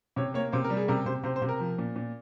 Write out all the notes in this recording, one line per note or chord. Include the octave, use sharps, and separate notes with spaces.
C3 C#5
A#3 C#5
C3 C5
A#4
G3
G#4
C3 A#4
C3 C5
C3 C5
C5
C3
A#4
F3
A#2
A#2